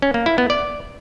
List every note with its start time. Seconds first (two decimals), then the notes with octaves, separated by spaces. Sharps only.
0.02 C#4
0.14 A#3
0.26 E4
0.38 B3
0.50 D5